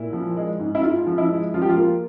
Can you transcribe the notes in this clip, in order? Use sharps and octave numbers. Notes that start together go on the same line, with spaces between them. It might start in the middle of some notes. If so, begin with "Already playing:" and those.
Already playing: A#2 E4
F3
G#3
G#2
E4
G#2 F4
F3
E4
G#3
F3 F4
G4
F4
A#3